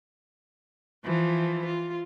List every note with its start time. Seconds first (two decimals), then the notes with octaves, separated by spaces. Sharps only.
1.04 E3 F3
1.65 F4